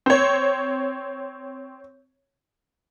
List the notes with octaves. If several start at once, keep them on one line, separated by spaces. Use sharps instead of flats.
C4 C#5